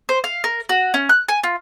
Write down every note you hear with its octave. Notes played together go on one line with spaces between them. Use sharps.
C5
F5
A#4
F#4
C#4
F#6
G#5
F4